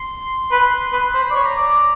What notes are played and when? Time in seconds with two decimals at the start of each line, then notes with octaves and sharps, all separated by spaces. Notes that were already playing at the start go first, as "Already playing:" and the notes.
Already playing: C6
0.52 B4
0.93 B4
1.14 C5 B5
1.30 D5
1.35 C#5
1.46 A#5
1.56 D5